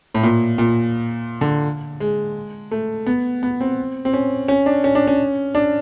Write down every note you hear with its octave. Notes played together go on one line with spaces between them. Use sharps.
A2
A#2
A#2
D3
G#3
A3
B3
B3
C4
C4
C#4
C#4
D4
C#4
D4
C#4
D4